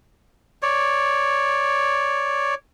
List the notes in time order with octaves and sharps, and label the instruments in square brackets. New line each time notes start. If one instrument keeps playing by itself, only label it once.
[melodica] C#5 D5